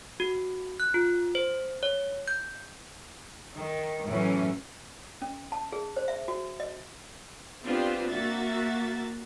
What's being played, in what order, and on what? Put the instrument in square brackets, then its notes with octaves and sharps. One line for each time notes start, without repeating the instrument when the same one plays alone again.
[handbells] F#4
F#6
F4
C5
C#5
G6
[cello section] D#3
A2 E3 F#3 C#4
[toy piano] C#4
A5
G#4
C5
E5
F#4
D#5
[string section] B3 C4 D4 F4 G4 C5
A#3 F#4 E5 A6